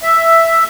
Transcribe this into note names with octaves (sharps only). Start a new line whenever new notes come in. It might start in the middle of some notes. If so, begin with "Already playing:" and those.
E5